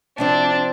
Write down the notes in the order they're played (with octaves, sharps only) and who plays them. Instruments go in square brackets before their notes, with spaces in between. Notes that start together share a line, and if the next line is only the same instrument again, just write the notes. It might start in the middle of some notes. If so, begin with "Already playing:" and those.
[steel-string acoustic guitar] C3 F3 C4 [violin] D4